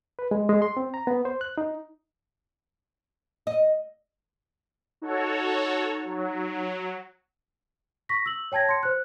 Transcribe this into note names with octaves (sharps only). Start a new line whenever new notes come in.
B4
G#3
G#3
C6
C4
A#5
B3
C5
F#6
D#4
D#5
D#4 F#4 A4 C#5
F#3
C#6 A#6 B6
E6 F#7
C#5 G5 A5 G#6 A#6
C6 C#7
C5 F#6